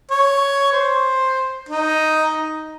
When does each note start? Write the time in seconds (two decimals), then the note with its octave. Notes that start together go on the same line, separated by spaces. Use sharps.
0.11 C#5
0.72 C5
1.69 D#4